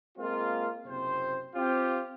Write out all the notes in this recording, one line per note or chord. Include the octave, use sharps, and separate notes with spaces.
G#3 A#3 C4 F4
F#1 C3 C4 C5
C4 F4 G4